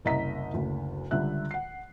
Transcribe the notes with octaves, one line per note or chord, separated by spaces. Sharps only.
F#1 C2 D#5 E5 A#5 B6
F#1 D2
C#2 D3 G3 E5 F#6
F#5 C7